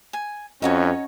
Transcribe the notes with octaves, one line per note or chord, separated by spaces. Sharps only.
G#5
F2 C#4 D#4 F#4 C#5